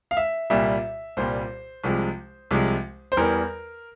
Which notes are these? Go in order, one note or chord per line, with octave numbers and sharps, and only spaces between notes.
F5
E5
C2 A#2 G3 E5
C2 A#2 G3 C5
C2 C3 F3 G#3
C2 C3 F3 G#3
C5
E2 E3 G3 A#4